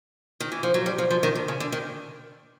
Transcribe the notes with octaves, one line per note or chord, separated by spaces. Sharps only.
D#3
E3
F3
F#3
G3
F3
F3
D#3
D3
C#3
D3
D#3